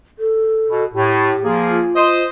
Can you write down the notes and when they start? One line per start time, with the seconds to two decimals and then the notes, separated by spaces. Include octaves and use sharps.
0.19 A4
0.69 B2
0.94 A2 G4
1.43 F3 A#3 G#4
1.68 F4
1.96 C5 D#5